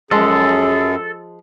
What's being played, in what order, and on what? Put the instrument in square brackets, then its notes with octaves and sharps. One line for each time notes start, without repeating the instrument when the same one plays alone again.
[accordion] F#2 [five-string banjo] F3 G#3 [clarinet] G#4 [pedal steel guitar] A4